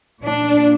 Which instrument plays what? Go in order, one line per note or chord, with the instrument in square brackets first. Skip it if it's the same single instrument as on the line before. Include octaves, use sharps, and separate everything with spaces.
[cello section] A#2 D4